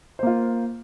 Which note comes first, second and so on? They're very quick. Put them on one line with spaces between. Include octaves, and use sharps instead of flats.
C5 A#3 F4